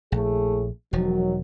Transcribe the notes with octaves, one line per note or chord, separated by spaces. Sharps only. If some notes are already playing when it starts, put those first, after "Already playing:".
A#1 A2 A3 G#4
E1 D#3 F3 F#3